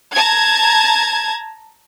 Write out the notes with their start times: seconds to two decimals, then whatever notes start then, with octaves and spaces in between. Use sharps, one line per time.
0.14 A5 A#5 G#6